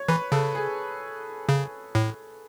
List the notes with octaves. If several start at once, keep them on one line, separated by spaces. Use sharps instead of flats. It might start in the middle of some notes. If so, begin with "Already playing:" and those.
Already playing: C#5
E3 B4
C#3 A4
G#4
C#3
A2